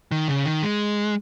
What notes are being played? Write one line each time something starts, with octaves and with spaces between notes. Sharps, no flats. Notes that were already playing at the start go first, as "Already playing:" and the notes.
D#3
C#3
D#3
G#3